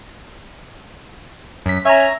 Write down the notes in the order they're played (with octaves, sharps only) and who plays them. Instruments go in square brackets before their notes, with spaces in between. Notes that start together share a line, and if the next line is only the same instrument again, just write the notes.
[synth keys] F#2 B6
[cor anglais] C#4 [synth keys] E5 A#5